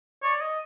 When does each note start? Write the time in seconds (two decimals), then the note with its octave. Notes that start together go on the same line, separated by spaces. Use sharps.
0.23 C#5 D5
0.41 D#5